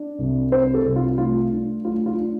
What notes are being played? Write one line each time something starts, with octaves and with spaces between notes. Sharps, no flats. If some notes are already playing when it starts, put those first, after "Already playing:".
Already playing: D4
C2
C3 C5
A4
C2
F4
A3 F4
D4
A3 F4
F4
D4